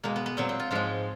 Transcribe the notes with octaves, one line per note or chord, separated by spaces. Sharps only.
B2 G#3 A#3
B3
B3
A#2 F#3 C4
C4
F4
G#2 F3 G#3 F4